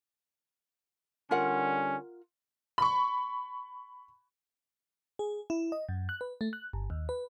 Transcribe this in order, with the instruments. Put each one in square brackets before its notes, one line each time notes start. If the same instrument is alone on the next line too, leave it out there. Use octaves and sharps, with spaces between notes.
[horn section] D3 G3 C#4 [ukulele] F4 A#4 F#5
[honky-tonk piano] B5 C#6
[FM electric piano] G#4
E4
D#5
F#2
F#6
B4
A3
F#6
G1
D#2
B4